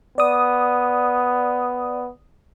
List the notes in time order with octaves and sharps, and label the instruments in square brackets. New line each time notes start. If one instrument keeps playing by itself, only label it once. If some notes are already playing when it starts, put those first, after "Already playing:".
[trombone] B3 [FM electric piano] D5 D#6